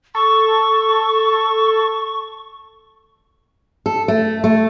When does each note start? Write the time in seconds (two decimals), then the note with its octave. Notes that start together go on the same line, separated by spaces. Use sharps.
0.15 A4 C#6
3.86 A4
4.08 A3
4.44 A3